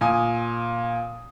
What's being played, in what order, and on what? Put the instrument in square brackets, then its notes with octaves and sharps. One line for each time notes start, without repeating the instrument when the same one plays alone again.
[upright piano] A#2 G#5 D#6